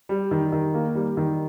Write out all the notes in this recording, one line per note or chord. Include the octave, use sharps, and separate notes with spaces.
G3
D#3
D#3
A#3
G3
D#3